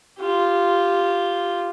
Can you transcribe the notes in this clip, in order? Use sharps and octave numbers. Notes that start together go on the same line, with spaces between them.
F4 G4